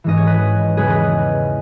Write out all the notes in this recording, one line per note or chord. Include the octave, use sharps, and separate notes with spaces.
G#2 E3 G#3 C#4 D#5
C#5
B4 D#5
E2 C#3 G#3 C#4 G#4 B4
B4 D#5